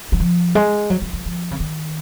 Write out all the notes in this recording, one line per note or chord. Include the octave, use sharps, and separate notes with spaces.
F#3
F3
G#3
F#3
F#3
F#3
F3
C#3
D#3